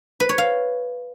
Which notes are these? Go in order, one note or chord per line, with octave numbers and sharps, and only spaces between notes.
B4
C#5
F5